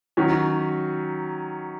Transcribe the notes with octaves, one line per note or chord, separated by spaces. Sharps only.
D#3 F#3 C#4